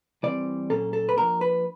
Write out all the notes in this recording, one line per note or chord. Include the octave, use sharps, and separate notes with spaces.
E3 G3 C4 D5
A#2 F#3 A#3 C#4 A4
A4
B4
F3 A#3 D4 A#4
B4